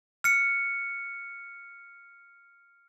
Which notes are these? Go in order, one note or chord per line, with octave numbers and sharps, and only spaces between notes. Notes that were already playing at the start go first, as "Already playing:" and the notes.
F6 C#7